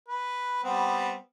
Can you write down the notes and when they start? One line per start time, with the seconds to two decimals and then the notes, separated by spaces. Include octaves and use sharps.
0.08 B4
0.64 G3 B3 C4